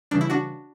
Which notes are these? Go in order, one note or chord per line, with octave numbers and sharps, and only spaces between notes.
C#3 E3 G3 D4
E4
D4 F#4